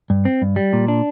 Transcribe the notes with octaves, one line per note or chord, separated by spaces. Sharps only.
G2
C4
G2
G3
A#2
D4